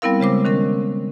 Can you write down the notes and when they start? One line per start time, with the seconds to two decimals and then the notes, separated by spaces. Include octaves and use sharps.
0.02 G3 B3 C4 E4 A#4 F5
0.20 C#3 G#3 C5 D6
0.45 D#3 C#4 A#4